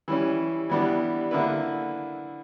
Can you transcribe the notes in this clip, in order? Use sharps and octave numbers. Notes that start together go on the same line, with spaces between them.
E3 G3 C#4
E3 G3 B3 D4
D3 A#3 E4 B4